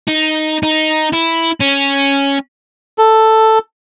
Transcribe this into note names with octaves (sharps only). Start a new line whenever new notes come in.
D#4
D#4
E4
C#4
A4